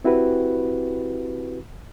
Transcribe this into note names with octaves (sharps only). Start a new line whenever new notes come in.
C4 E4 F#4 G4 B4